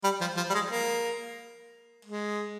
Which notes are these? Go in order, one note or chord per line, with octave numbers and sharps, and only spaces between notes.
G3
F3
F3
G3
G#3
A#3
G#3